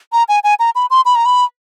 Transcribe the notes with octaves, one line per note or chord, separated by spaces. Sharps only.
A#5
G#5
G#5
A#5
B5
C6
B5
A#5
B5